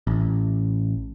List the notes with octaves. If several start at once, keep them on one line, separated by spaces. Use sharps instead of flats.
A1